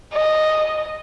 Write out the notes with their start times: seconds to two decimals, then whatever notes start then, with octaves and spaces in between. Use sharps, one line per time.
0.13 D#5